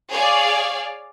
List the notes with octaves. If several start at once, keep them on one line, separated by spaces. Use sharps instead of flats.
G#4 C#5 D5 F5